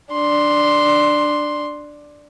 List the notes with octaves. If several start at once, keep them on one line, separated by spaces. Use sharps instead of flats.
D4 C6